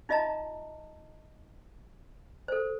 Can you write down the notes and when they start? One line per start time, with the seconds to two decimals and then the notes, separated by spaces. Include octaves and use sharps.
0.09 D#4 F4 D#5 E5 A5 A#5
2.48 A4 C5